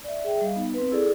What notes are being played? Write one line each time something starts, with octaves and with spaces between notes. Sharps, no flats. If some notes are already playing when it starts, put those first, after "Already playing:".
D5 E5
G#4 E5 G5
G3 D#5 F5
B3 D#4
C4 B4
E4 G#4 A4 D5